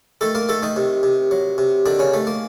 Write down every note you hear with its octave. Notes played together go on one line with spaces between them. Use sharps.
D#3 A3 A4
A#3 A#4
D#3 A3 A4
D#3 D#4
C3
C3
F#3
C3
D3 D#3 D4
C#3 C#4
D#3 A3
A#3